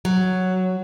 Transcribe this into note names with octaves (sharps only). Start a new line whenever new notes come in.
F#3